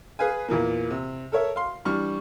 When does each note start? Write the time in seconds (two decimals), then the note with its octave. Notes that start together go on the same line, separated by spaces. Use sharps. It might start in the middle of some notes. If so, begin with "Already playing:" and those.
0.19 G#4 B4 F5 G#5
0.48 E2 A#2 E3 A#3
0.90 C3
1.32 A4 A#4 C#5 E5
1.56 F5 C6
1.85 E3 G3 D4 C#6 F6